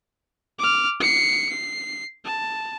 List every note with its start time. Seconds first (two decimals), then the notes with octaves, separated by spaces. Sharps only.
0.59 D6 F6
1.00 C7 C#7
1.49 C7
2.25 A5